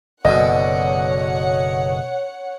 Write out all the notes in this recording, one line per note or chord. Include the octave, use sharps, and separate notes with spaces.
F#1 F#2 B2 D3 C#5 D#5 F#5